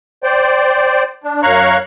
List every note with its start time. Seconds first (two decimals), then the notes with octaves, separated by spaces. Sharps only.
0.23 C5 D5 G5
1.24 D4
1.43 F#2 C#5 F5 A#5 C#6 F#6